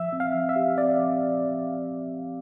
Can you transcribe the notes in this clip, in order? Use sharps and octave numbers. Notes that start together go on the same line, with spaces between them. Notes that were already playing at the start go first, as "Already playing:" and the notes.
Already playing: F3 E5
C4
F5
F3
E5
G4
C4 D5
F3